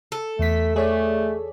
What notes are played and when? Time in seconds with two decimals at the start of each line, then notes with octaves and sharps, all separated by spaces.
0.12 A4
0.39 E2 A3 B6
0.76 A3 G#4 C#5 D5